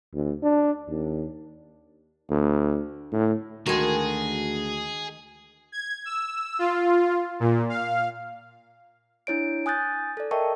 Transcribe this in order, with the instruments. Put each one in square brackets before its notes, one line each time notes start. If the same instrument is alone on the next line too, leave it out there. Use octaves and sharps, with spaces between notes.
[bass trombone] D2
D4
D#2
[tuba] D2
A2
[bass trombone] D2 [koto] D#3 G#3 [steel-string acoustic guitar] F#4 A4 [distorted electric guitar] G#4
[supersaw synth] G#6
E6
F4
A#2
F5
[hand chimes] D4 E4 C#5 D7
G#5 D#6 F#6 G6 A6
A4 D5
A#4 D#5 E5 G5 A5 C#6